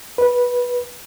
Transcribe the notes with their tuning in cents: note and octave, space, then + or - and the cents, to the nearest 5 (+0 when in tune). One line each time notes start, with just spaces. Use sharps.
B4 -15